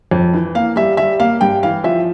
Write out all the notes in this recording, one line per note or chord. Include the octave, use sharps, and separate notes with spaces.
F2
E3
A#3 F5
G3 E5
G3 E5
A#3 F5
G2 G5
E3 F5
F3 E5